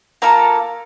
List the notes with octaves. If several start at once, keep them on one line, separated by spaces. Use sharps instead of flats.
A#3 F4 A4 A#5